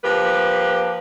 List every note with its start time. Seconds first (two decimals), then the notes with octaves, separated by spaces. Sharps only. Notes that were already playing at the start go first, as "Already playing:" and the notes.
0.04 F3 A#3 G4 B4